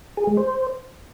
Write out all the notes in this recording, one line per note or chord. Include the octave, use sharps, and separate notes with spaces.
G#4
G#3
C5